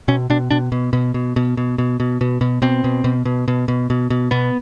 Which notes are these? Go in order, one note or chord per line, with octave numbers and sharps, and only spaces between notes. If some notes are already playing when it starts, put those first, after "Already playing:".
B2 C#4
B2 D4
B2 D4
B2
B2
B2
B2
B2
B2
B2
B2
B2
B2 C4
B2
B2
B2
B2
B2
B2
B2
B2 B3